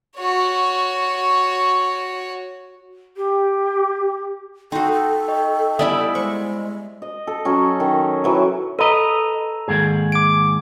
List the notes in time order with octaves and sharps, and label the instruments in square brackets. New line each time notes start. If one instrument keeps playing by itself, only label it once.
[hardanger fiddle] F#4 C#5
[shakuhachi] G4
[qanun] D#4 F#4 [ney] A4 [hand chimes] G5 C6
[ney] A4
[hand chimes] D#5 G5 C#6
[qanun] G3 B3 G4 [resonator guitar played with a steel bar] E4 D5 E5 [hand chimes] G#5 D#6
[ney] G#3 [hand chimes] C5 [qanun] C#6
[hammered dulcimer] D#5
A4
F#3 C#4
D#3
E3 F#3
[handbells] A4 A#5 [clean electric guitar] B4 D#5
[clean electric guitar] D#2 G#2 G#4
[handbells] D6 D7